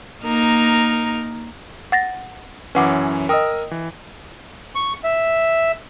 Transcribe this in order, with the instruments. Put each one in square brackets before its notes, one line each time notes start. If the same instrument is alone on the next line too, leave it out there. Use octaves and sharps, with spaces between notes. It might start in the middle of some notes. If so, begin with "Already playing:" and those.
[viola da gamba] A#3 D#4 A#4
[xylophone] F#5 A6 A#6
[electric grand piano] F#2 E3 C#4 [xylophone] B4 F#5 D6
[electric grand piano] A#4 D#6 E6 [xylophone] D#5 G5
[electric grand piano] E3
[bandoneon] C#6
E5